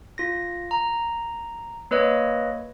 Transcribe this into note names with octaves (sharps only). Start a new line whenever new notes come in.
F4 A#6
A#5
A#3 B4 C#5 D#5